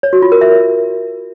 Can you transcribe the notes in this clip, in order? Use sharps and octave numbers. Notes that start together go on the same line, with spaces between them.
C#5
F#4
F4
A#4
E5